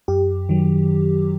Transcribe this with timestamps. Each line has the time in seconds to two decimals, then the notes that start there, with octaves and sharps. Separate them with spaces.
0.08 F#2 G4
0.49 D#3 F#3